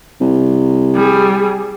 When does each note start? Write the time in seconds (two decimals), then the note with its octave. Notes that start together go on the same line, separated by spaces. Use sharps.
0.21 C2
0.95 G3 G#4